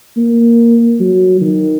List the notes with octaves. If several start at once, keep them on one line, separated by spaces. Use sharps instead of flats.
A#3
F#3
D#3